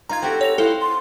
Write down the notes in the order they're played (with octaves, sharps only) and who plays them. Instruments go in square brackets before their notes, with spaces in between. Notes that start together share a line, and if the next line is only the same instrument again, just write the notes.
[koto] D#4 F4 [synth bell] A#5 G#6
[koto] C4 F#4 G4 [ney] A4
[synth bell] C#5 A#6 F7
[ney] E4 [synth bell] A4 [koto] C5 F5 F#5
[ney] C6